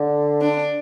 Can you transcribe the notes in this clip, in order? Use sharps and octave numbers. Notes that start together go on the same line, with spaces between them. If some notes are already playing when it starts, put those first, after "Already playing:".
Already playing: D3
D4